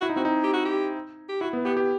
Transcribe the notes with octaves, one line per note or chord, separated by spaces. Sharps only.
E4 F#4
D#4
C4 F#4
D#4
G4
F#4
G4
G4
E4 F#4
B3
B3 G4
G4